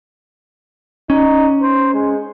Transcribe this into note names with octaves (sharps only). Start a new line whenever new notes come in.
C#4 D#4
C5
G#3